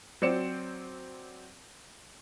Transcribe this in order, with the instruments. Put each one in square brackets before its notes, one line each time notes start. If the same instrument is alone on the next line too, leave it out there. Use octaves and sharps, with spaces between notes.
[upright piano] F#3 C4 C5 D5 C#7 E7